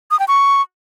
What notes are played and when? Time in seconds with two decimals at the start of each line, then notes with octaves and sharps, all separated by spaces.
0.11 D#6
0.19 G5
0.28 C#6